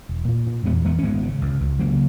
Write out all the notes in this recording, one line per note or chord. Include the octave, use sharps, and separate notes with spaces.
E1
A#2
A#2
E2 G#3 B3
E2 G#3 B3
C#4
G#1 G#3 B3
C#3
C#2
C#2
C#3 F#3 A#3